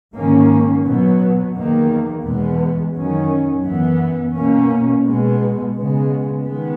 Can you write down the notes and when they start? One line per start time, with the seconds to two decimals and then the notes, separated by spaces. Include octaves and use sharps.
0.13 G#2 D#3 A#3 C#4
0.84 B2 F#3 B3
1.54 E2 D#3 A#3
2.23 E2 B2 G#3 B3
2.94 F#2 D#3 F#3 C#4
3.63 F#2 E3 B3
4.34 B2 A#3 C#4
5.03 B2 G#3 B3
5.73 C#3 G#3 B3
6.44 D#3 G#3 B3